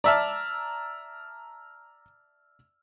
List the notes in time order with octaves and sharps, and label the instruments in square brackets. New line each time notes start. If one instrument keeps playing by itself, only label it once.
[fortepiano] D5 E5 A5 [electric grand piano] A#5 E6 F6